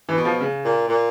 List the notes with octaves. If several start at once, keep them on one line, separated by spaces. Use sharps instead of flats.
E3
B2
F3
C#3
A#2
A#2